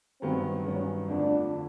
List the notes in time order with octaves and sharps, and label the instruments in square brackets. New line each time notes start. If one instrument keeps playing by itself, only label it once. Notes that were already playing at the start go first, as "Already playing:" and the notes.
[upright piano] G2 D#3 F#3 B3 [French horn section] C4
[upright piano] G2 D#3 F#3 B3 [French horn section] C#4
[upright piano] F2 D3 F3 A3 [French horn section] D4
[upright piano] D3